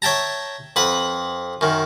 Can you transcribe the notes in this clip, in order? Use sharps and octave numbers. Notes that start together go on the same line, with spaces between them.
C#5 E5 G5 A5 A#5
F2 B4 F#5
F#2 D#3